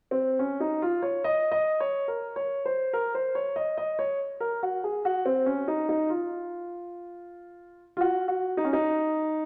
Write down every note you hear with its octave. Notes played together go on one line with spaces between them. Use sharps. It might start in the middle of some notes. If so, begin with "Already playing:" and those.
C4
C#4
D#4
F4
C#5
D#5
D#5
C#5
A#4
C#5
C5
A#4
C5
C#5
D#5
D#5
C#5
A#4
F#4
G#4
F#4
C4
C#4
D#4
D#4
F4
F4
F#4
F#4
D#4
C#4
D#4